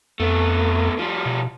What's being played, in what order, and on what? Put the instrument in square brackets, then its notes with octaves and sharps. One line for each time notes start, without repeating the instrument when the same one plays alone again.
[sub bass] F2 [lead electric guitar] A3 B3
[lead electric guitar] F3 G3
[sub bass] B2